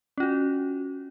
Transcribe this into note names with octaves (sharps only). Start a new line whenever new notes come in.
C#4 F4 F#4